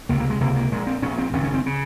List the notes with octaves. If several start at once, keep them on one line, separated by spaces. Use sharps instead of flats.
C#2 C3 A#3
A#3
G#3
C#2 C3 A#3
A#3
A#1 A#2 G#3
C4
A#1 A#2 C#4
C4
G#1 F#2 C#3 C#4
C#4
C4
C#3